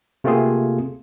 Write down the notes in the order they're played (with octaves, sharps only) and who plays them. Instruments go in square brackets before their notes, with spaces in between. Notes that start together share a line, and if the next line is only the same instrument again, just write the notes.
[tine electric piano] C3 A3 A#3 C4 F4 G#4